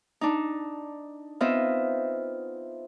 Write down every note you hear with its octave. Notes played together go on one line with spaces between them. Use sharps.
D4 D#4
B3 C4 F4 D#5 E5